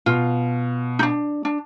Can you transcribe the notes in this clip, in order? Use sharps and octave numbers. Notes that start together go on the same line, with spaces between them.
B2 F4
D4 D#4
D4